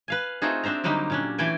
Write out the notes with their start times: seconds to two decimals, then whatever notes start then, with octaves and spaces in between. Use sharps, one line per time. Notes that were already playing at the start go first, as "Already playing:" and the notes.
0.08 B4 F5 G#5
0.42 A3 C4 D#4 F4 F#4 G#4
0.64 C4 D4 C5 E5 A#5
0.84 D3 F#3 G3 A#3 D#4 G4
1.10 A#2 C#4 D4
1.38 E3 A3 E4 G5 G#5